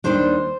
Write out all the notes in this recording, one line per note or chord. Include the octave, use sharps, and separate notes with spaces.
D#2 D#3 G3 D4 C5